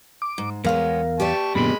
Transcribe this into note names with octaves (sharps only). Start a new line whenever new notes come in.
D6
G#2
E2 G#3 B3 A#4 C#5 F5
G4 B4 D5 A5 C#6
F#2 A#2 D3 G#3 B3 B5